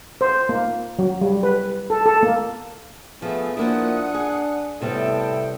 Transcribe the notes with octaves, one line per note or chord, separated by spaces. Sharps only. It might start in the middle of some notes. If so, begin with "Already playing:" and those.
C5
A#3
F#3
G3
B4
A4
A4
A#3
F3 A3 B3 G#4
F3 A#3 D4 E4 F#5 D#6
G#4
A2 C3 G3 B3 A4 G5